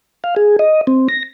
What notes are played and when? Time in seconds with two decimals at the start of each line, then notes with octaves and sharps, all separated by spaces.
0.24 F5
0.36 G#4
0.59 D#5
0.87 C4
1.09 A#6